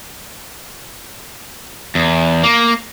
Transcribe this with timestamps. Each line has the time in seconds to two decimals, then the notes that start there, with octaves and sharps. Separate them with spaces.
1.95 E2
2.44 A#3